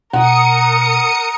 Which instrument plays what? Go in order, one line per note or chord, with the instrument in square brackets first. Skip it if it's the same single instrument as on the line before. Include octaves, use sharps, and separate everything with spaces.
[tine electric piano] B2 [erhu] A#4 [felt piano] F#5 [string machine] D#6 C#7